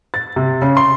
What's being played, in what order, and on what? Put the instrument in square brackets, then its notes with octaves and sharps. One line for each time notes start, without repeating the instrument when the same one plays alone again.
[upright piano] A6
C3
C#3
C6